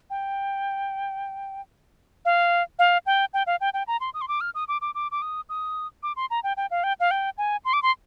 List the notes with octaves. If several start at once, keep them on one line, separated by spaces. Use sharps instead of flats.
G5
F5
F5
G5
G5
F5
G5
G5
A#5
C6
D#6
C6
D6
F6
D#6
D6
D6
D6
D6
D#6
D#6
D6
C6
A#5
G5
G5
F5
G5
F5
G5
G#5
C6
D6
C6